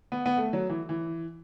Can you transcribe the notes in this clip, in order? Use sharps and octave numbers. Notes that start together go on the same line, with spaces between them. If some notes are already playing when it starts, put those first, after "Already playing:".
B3
B3
A3
F#3
E3
E3